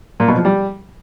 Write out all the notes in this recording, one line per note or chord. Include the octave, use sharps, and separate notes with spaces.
A#2
B2
F3
G3